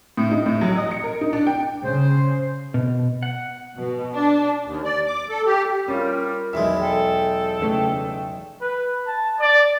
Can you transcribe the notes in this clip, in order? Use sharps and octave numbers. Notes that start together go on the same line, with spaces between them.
A2
D#4
A2
F#3
D#5
C#7
A#4
D#4
D4
G5
C#3 C5
B2
F#5
B2
D4
D#2
D5
D6
A4
G4
G3 C#4 F4 A#4
B1 E2 G#3 E4 E5
A4 G5
C#3 E3 A3
B4
A5
D5